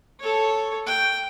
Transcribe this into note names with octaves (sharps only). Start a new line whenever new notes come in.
A4 C#5
G5